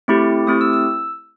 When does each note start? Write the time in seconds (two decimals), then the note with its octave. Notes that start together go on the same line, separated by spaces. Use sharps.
0.08 A3 C4 E4 G4
0.47 A3 C4 E4 G4 D#6
0.61 E6
0.73 E6